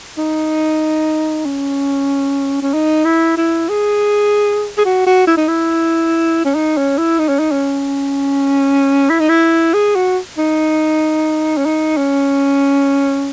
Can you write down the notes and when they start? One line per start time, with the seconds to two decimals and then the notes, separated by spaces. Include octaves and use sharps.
0.18 D#4
1.46 C#4
2.62 C#4
2.74 D#4
3.05 E4
3.37 E4
3.69 G#4
4.78 G#4
4.85 F#4
5.06 F#4
5.27 E4
5.37 D#4
5.48 E4
6.45 C#4
6.55 D#4
6.77 C#4
6.98 E4
7.19 D#4
7.29 C#4
7.39 D#4
7.51 C#4
9.10 E4
9.20 D#4
9.29 E4
9.74 G#4
9.95 F#4
10.38 D#4
11.57 C#4
11.65 D#4
11.97 C#4